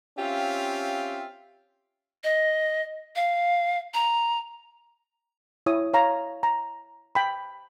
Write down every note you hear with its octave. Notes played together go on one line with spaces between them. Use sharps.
C4 C#4 F4 G4 E5 F5
D#5
F5
A#5
E4 C#5 D#6
C#5 F5 A#5
A#5
G5 B5